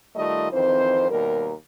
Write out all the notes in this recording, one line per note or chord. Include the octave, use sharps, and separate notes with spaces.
D#3 G3 A3 F4 D5 D#5
F2 D#3 E3 C4 C5
D#2 B2 G3 A#4